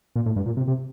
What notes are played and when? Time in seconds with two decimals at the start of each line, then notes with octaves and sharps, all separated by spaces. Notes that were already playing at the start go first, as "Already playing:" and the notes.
0.15 A#2
0.26 A2
0.36 G2
0.46 A#2
0.57 C3
0.68 C3